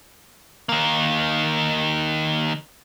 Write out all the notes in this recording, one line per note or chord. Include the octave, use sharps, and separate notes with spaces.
D#3 A#3